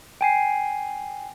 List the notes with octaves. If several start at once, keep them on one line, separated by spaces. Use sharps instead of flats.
G5 G#5 C7